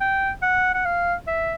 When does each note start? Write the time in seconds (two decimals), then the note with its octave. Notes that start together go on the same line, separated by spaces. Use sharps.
0.01 G5
0.43 F#5
0.74 F#5
0.85 F5
1.27 E5